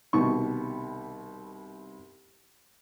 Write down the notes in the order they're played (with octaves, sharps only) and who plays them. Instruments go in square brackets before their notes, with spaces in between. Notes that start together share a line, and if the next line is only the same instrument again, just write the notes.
[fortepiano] C2 B2 D#3 C#6